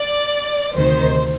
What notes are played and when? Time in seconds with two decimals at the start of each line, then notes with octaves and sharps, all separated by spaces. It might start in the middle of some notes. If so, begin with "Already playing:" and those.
Already playing: D5
0.74 D2 C3 D#3 C5